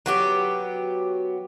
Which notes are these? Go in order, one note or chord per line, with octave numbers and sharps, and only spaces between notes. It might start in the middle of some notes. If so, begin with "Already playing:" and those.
F#3 B3 G4